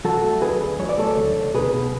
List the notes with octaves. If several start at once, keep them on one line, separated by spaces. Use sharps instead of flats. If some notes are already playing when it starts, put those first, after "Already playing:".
F#3 F#4 A4
A3
D2 G#4 B4
D2
F#3 C#5
D5
A3 A4 C#5
D2
D2
B1 G#4 B4
B2